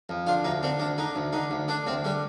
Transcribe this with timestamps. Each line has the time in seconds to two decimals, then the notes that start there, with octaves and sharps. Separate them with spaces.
0.09 F2
0.27 D3 F4
0.44 D2 D#4
0.63 D3 C4
0.79 D2 D4
0.98 D3 D#4
1.16 D2
1.33 D3 D#4
1.51 D2
1.68 D3 D4
1.86 D2 C4
2.04 D3 G3